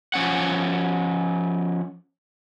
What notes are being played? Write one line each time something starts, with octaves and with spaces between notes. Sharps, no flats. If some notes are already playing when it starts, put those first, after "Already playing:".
F3 C#4 F#5